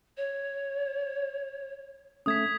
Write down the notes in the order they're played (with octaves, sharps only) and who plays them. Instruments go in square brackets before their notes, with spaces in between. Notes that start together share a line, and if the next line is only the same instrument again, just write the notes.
[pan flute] C#5
[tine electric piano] A3 C#4 [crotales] D#6 G#6 B6